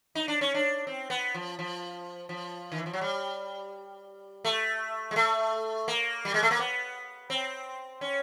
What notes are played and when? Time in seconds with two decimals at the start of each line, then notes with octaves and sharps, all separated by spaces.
0.15 D#4
0.28 D4
0.41 C#4
0.55 D4
0.87 C4
1.10 B3
1.34 F3
1.59 F3
2.29 F3
2.72 D#3
2.78 E3
2.86 F3
2.93 F#3
3.01 G3
4.45 A3
5.11 G#3
5.16 A3
5.88 A#3
6.25 G3
6.34 G#3
6.43 A3
6.51 A#3
6.59 B3
7.30 C4
8.01 C#4